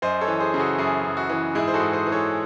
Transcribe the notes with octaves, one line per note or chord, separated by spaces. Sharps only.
F#2 C5 D#5
A4 C#5
E3
G#4 C5
C#3
F#4 A4
F#2 E4 G#4
F#2
F#4
E3
G#2 E4 G#4
C5
F#4 A4
G#2
G#4 C5
E3
A4 C#5